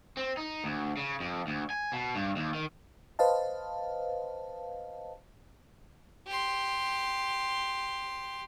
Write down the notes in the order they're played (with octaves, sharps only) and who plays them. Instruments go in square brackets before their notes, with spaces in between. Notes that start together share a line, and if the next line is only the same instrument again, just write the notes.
[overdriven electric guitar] C4
D#4
D2
C#3
F2
D2
G#5
B2
G2
D#2
D#3
[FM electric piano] B4 C5 D#5 F5 A5
[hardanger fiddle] G4 C6